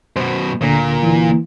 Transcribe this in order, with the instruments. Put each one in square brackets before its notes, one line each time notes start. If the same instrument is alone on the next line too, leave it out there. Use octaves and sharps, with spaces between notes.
[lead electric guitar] F#2 B2 [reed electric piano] C5
[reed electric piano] D2 D3 A#5 [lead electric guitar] A#2
[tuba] E3